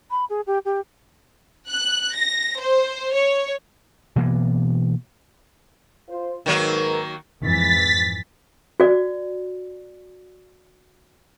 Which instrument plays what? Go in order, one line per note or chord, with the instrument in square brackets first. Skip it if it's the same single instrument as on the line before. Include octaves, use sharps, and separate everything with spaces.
[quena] B5
G#4
G4
G4
[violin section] F#6
A#6
C5
C#5
[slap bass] B2 E3 A#3 B3
[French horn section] F4 C5
[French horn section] G#2 A#4 B4 [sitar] D#3 F#3 A#3
[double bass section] F2 G#2 E3 [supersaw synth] A6 B6
[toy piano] F#4 D5